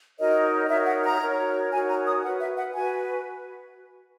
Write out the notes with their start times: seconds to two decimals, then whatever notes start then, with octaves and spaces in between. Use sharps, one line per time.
0.18 D#4 F#4 A#4 C#5 D#5
0.63 D#5
0.69 D#4 F#4 A#4 C#5 E5
0.85 F#5
1.03 A#5
1.19 D#4 F#4 A#4 C#5
1.71 D#4 F#4 A#4 C#5 G#5
1.88 A#5
2.05 D#6
2.22 F#4 B4 F#5
2.40 E5
2.56 F#5
2.73 F#4 B4 G#5